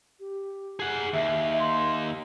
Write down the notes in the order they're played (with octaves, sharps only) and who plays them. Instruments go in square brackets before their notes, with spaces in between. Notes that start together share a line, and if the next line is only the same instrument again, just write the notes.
[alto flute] G4
[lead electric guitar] G#4 F#5
[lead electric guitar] D#2 [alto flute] E5
[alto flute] C6